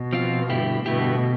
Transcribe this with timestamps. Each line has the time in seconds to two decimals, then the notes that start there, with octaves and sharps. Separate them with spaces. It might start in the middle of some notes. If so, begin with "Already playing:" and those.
Already playing: B2
0.13 F3 C4 F4
0.49 G2 D3 A3 E4 G4
0.86 G2 B2 D3 A3 E4 G4